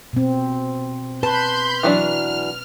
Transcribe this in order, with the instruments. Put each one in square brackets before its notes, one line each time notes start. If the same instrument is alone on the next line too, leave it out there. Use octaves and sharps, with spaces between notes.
[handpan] B2 C4
[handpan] B4 [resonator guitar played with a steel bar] A5 [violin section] B5 C6 G6
[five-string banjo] E3 F#3 D4 [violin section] F6